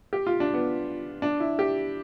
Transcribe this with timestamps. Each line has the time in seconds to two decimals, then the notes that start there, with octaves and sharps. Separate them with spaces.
0.13 G4
0.27 F4
0.40 D4
0.54 B3
1.22 D4
1.40 E4
1.59 G4